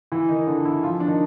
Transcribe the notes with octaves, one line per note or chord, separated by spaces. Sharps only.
E3 E4
D#3 D#4
D3 D4
E3 E4
F3 F4
D4
D#3 D#4